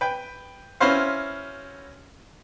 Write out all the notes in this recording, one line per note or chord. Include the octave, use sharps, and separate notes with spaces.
B4 G5
C#4 E4 F#4 B4 C5 F5